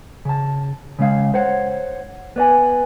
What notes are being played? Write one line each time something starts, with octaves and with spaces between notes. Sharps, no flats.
C#3 A5
C#3 G#3 F5
C5 C#5 F#5
B3 D5 G#5